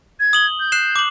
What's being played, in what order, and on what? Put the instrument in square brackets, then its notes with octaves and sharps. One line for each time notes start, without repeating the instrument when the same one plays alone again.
[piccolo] G#6
[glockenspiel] D#6 F#7 G7
[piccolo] G6
[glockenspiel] F#6 C7 E7
D6 F#7